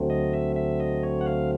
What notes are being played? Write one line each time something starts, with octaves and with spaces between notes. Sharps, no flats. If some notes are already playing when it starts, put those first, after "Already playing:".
Already playing: D2 D3 F#3 A3 C4
D#5
E5
E5
D#5
C#5
F#5
F5